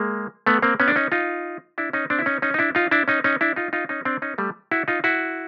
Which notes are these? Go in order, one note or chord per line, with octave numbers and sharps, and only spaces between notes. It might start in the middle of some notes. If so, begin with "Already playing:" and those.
Already playing: G#3 A#3
A3 B3
A#3 C4
B3 C#4
D4
C#4 D#4
D#4 F4
D4 E4
C#4 D#4
C4 D4
E4
C#4 D#4
C#4 D#4
D#4
D4 E4
D#4 F4
D4 E4
C#4 D#4
C#4 D#4
D4 E4
D#4 F4
D#4 F4
C#4 D#4
C4 D4
C#4 D#4
G3 A3
E4 F#4
D#4 F4
E4 F#4